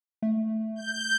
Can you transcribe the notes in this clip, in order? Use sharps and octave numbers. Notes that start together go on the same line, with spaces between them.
A3
G6